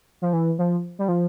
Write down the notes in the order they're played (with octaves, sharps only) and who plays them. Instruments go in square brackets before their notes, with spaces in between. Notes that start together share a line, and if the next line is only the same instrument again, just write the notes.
[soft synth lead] F3
E3
F3
G3
F3